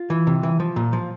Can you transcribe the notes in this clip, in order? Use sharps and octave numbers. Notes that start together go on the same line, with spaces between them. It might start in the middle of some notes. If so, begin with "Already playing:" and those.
Already playing: F4
E3
C3
E3
F3
A#2
F3